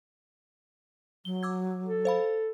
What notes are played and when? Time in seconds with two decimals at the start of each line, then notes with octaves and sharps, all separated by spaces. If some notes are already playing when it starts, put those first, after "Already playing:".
1.25 F#3 G7
1.43 D6 E6 G#6
1.85 A4
2.05 C5 F5 B5